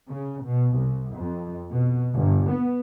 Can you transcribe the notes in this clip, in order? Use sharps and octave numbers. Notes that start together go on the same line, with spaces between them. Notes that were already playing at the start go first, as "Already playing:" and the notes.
C#3
B2
C2
F2
B2
G1
B3